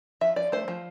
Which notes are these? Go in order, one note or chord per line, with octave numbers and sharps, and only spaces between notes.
F3 E5
F3 D5
A3 C5
F3